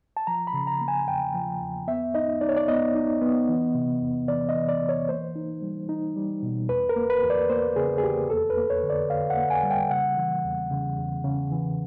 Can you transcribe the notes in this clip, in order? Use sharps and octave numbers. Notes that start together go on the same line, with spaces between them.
A5
F3 A#5
B5
C#3
A#5
A#3
G#5
E2 G5
F3
E2
B3 E5
D#4 D#5
D#4 D5
C#5
D5
B3 D#5
D#4
B3
E3
C3
E2
E3 D5
D#5
E3
D5
E3
C#5
A#3 C5
D#4
G3
D#4
G3
B2
E2 B4
A#4
A#3
B4
E2
D5
A#3 C5
C#3 G#4
G#4
E2 G4
F2 A4
B4
A#3
C#5
D3
D5
D3 F5
F#5
A#3
G#5
G3
G5
C#3 F#5
E3
E2
C#3
E2
C#3
E3